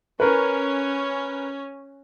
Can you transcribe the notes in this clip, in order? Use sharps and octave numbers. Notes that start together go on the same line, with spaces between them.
C#4 A#4 B4